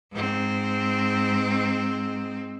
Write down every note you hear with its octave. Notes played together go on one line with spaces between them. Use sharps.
G#2 C4